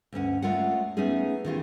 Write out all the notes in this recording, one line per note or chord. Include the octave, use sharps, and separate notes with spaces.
D2 G2 C#4 F#5
G#3 A3 F4 A#4 C#5 F#5
A3 B3 C#4 D#4 G#4
D#3 E3 F4 G4